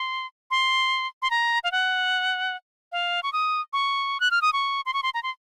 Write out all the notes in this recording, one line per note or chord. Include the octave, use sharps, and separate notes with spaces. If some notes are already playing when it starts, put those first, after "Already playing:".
Already playing: C6
C6
C6
A#5
F5
F#5
F5
C#6
D#6
C#6
F#6
F6
D#6
C#6
C6
C#6
C6
A#5
C6